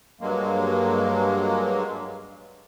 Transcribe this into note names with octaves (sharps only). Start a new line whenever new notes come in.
G2 F#3 G#3 A#3